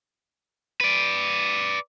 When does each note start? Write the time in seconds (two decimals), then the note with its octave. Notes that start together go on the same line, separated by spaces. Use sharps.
0.81 B4 D5